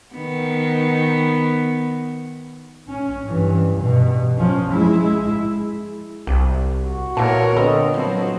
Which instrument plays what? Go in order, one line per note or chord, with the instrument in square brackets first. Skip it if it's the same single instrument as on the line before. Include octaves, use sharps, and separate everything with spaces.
[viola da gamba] D#3 B3
[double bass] C#4
G2 E3
G2 B2
F3 C#4
G#3 E4
[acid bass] C2 [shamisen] G4
[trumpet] F#4
[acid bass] A#2 [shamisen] E3 A5 [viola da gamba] B3 A#4 C#5
[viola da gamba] D3 [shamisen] C4 A4 B4 [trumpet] D#5
[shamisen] F3 [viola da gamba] F#3 C4 [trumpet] B3